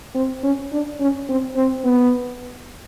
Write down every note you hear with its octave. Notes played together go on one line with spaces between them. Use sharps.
C4
C#4
D4
C#4
C4
C4
B3